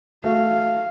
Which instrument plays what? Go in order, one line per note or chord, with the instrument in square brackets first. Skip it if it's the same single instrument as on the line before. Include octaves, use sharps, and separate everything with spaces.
[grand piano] A3 F#4 [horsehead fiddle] F5